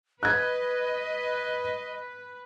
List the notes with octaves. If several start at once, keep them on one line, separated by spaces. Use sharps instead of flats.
B4 D#5 F#6 G#6